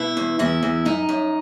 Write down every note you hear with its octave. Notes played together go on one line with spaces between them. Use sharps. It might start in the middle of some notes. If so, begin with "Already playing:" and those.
Already playing: B2 E4
E2
E2 E4
E2
F#2 D#4
F#2